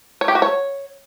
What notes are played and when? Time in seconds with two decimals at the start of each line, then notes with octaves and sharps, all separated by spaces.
0.21 C#5
0.28 G4
0.35 F#4
0.42 C#5